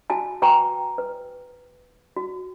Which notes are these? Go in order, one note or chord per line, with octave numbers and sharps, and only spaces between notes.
F#4 G#5 A5
F#4 B4 G5 G#5 A#5 C#6
B4
F#4